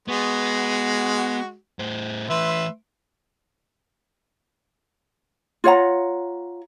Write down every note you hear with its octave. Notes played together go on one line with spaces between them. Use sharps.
G#3 B3 F#4
A2 C5
E3 A3 B4 E5 C6
F4 C#5 F#5 A#5